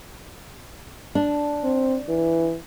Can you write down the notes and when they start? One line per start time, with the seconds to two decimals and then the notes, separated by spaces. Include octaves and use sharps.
1.15 D4
1.63 C4
2.08 E3